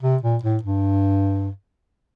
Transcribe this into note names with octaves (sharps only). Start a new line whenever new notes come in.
C3
A#2
A2
G2